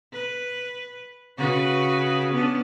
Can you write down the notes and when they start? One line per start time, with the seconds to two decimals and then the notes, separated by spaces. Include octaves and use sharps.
0.13 B4
1.37 C#3 F#4 B4
2.33 B3 C#4 D4